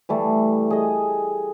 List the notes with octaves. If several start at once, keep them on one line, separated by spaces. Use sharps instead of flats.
E3 G3 A3
G#4 D#5